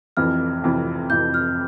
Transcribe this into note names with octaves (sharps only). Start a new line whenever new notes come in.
F1 F2 C3 E3 F6
F1 F2 C3 E3
F1 F2 C3 E3 G6
F6